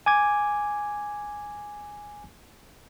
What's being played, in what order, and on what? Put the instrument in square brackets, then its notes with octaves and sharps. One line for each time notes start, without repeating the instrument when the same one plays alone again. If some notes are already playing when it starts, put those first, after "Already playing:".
[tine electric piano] G#5 D6 G#6